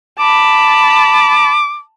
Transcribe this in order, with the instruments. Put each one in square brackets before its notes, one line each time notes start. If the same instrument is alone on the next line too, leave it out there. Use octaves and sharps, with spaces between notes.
[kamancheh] A5 B5 [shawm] D6